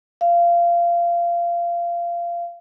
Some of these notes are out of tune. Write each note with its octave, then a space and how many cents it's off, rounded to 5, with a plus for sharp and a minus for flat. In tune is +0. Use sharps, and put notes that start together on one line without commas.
F5 -20